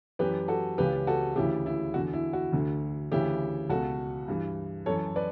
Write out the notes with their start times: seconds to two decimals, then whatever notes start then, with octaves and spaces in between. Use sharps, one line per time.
0.19 F#2 E3 G4 B4
0.48 F#4 A4
0.78 C#2 C#3 E3 G4 B4
1.07 F#4 A4
1.36 D2 C#3 E3 E4 G4
1.66 E4
1.94 E2 D3 F#4
2.13 E4
2.33 F#4
2.52 D2 D3
3.12 D2 C#3 E3 E4 G4
3.69 C#2 B2 F#4 A4
4.28 G2 E3
4.86 F#2 E3 A4 C#5
5.16 B4 D5